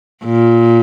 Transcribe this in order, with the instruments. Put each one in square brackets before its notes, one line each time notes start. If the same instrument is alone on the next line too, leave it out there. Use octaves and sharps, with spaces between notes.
[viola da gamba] A#2